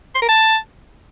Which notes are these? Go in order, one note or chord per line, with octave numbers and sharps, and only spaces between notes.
C6
A#4
A5